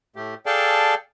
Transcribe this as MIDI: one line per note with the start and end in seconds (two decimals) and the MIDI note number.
0.16 0.34 45
0.16 0.34 57
0.16 0.34 67
0.46 0.94 68
0.46 0.94 69
0.46 0.94 74
0.46 0.94 77
0.46 0.94 79
0.46 0.94 81